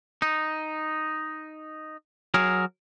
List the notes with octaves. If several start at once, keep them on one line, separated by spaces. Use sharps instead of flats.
D#4
F#3 G#4 A#4